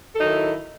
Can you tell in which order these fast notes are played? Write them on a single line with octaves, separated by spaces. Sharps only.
A4 F#3 D#4 D#3 E4